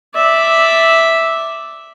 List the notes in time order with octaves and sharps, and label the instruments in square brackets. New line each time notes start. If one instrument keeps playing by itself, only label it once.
[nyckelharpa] D5 E5